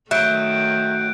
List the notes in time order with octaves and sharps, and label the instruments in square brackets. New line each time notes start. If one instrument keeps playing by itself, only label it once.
[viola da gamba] D#3 A3 [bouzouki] F#3 [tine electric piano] E5 [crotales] F#6 G6 D7